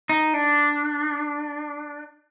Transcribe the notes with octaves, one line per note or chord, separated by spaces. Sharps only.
D#4
D4